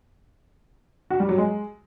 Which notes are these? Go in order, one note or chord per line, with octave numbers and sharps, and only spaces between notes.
F#4
G3
F#3
G#3